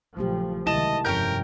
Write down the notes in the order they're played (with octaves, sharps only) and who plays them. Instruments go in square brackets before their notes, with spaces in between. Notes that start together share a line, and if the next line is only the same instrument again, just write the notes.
[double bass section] A#1 C#3 F3 [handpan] F#3 A3 G4
[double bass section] C#2 C3 D#3 [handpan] E4 [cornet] D#5 [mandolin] A5
[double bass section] G1 F2 C3 [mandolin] C#4 G5 G6 [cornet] A#4